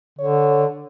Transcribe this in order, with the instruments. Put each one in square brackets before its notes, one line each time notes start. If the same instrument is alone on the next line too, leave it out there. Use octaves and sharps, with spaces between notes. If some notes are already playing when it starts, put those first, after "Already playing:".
[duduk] D3 [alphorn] C#5